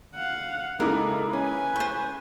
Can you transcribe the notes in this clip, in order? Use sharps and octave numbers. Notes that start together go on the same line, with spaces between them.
F5 F#5
C#3 G#3 A#3 D#4 E4 A4 A#4 D6
C#4 B4 G#5
C5 C#6 G6